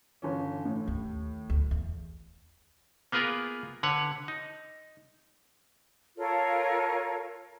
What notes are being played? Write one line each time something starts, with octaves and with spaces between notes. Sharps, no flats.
G1 E3 C#4
A2
D#2
D2
E2
A#3 B3 F4 G#4 A#4 B4
D3 B4 C#5 F#5
D#4
F4 A4 A#4 C#5